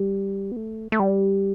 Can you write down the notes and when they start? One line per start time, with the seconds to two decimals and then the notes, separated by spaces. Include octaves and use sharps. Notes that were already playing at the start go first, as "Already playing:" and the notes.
Already playing: G3
0.52 B3
0.56 A3
0.92 A3
1.00 G3